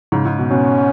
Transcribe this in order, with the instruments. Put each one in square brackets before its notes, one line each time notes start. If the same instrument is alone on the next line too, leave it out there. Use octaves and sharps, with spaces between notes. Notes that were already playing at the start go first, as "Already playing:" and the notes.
[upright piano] G#2 C#3
G#2
B2
[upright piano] B2 [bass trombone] C#4